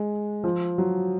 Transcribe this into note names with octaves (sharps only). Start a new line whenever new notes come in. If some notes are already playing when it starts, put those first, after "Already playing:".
Already playing: G#3
F3
F#3